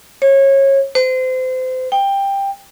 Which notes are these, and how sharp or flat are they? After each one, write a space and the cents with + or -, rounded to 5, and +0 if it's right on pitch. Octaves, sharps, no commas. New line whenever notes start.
C#5 -25
C5 -30
G5 +15